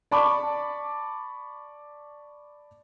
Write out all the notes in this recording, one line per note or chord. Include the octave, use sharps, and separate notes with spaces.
D5 A5 B5 C#6 D6